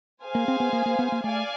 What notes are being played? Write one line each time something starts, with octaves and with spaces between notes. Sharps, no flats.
G#4 C5 F5 G#5
A#3
C4
B3
A#3
A#3
B3
A#3
A3 D5 F5 G#5